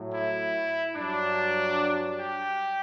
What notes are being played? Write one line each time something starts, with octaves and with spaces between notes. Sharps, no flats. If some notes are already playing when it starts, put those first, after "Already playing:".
Already playing: A2 F#3
E4
G2 F#3 D4
G4